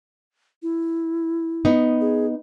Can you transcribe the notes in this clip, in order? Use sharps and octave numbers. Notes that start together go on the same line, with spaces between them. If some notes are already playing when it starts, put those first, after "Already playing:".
E4
B3 D#4
G#4